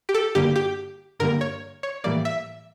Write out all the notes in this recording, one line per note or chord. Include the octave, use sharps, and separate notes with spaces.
G4
A4
G2 D3 G3 A#3 G4
G4
G2 D3 G3 A#3 A#4
C#5
C#5
A2 E3 G3 A#3 D5
E5